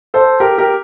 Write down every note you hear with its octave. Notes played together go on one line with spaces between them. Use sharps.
A4 C5
G4 A#4
G4 A#4